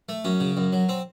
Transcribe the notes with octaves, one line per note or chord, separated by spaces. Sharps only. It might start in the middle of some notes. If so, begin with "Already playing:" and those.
A3
F#2 C#4
C#3
F#2
F#3
C4